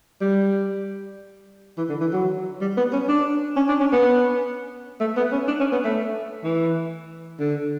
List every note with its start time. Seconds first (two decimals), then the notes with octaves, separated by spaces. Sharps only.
0.21 G3
1.78 E3
1.89 D3
2.01 E3
2.13 F#3
2.61 G3
2.77 B3
2.93 C#4
3.09 D4
3.56 C#4
3.69 D4
3.80 C#4
3.93 B3
5.00 A3
5.17 B3
5.32 C#4
5.48 D4
5.60 C#4
5.72 B3
5.84 A3
6.44 E3
7.40 D3